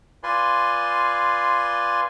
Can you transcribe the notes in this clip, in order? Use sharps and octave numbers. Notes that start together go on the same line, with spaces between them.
F4 B4 D5 G#5 C6